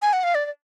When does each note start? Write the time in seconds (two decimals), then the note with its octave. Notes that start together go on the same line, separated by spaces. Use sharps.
0.02 G#5
0.13 F#5
0.24 F5
0.35 D5
0.45 D5